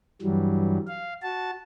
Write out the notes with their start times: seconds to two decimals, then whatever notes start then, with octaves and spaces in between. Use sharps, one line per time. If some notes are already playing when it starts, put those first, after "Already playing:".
0.22 G2 E3 F#3 G3
0.87 F5
1.22 F#4 A5